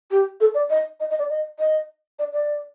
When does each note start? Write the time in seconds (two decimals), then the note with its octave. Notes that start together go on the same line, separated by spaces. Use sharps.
0.11 G4
0.41 A4
0.54 D5
0.70 D#5
1.00 D#5
1.10 D#5
1.19 D5
1.30 D#5
1.59 D#5
2.19 D5
2.33 D5